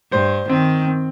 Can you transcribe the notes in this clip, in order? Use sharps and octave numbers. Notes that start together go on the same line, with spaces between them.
G2 C5
D#3 C4
C4